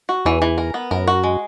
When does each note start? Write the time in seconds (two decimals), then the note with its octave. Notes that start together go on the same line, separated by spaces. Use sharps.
0.09 F#4
0.25 E2 E3
0.42 E3
0.58 A#4
0.74 B3
0.91 F#2 A#4
1.07 F#4
1.24 G#3